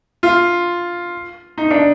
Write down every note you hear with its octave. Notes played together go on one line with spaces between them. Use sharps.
F4
D#4
D4